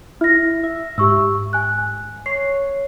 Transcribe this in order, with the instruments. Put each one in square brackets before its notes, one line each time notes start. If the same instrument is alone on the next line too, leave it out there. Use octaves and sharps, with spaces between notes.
[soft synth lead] E4 [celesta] F6 A#6
[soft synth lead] E5
[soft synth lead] G#2 [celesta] G4 C#6 E6
[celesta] G#5 F#6
[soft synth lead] C#5 [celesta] C7